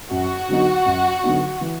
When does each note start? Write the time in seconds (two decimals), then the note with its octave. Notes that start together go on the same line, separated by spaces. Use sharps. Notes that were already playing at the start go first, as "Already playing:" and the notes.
0.11 F#2 F#4
0.49 D3 F#3 B3 D#4
0.86 F#2
1.24 D3 F#3 B3 D#4
1.61 E3